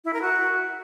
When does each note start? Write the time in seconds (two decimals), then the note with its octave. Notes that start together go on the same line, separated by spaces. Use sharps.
0.05 E4
0.13 A#4
0.22 F#4